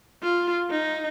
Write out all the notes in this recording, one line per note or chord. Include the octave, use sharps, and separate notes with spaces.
F4
D#4